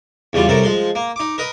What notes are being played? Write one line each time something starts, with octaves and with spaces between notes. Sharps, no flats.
E2 C#3 G3 F4
C2 F#2 C3 A4 A#4
F3 G#3 C6
A#3
D#4 D6
A#4 B4 D#5